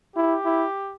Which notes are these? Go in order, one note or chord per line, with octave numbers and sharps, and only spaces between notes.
E4 G4
E4